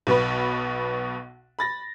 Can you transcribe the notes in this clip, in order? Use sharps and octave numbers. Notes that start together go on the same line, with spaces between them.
B1 B2 B3 B4
B5 A6 A#6